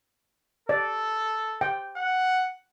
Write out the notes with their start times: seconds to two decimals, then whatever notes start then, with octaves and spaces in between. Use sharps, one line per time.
0.69 A4 D5
1.61 G5
1.97 F#5